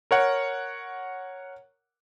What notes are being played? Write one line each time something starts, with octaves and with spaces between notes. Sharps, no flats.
A#4 C#5 F#5